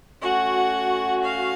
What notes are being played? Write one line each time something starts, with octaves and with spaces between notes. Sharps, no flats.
A3 C#4 F#4 F#5
F5